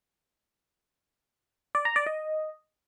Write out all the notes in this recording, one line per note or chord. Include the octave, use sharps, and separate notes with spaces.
D5
A#5
D5
D#5